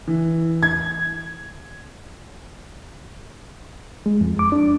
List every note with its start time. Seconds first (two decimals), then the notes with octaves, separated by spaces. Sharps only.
0.07 E3
0.63 G#6
4.06 G#3
4.21 F2
4.39 D6
4.52 D4